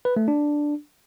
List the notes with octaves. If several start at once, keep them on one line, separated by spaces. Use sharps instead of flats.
B4
A3
D4